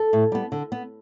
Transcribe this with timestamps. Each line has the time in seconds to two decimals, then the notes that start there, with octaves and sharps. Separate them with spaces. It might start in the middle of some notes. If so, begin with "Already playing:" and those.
Already playing: A4
0.13 A2
0.32 G3 B3
0.52 D3
0.72 B3